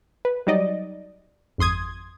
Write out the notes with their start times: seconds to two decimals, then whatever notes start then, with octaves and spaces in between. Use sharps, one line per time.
0.25 B4
0.47 F#3 G3 D#4 D5 D#5
1.58 G#1 F2 C6 D#6 G#6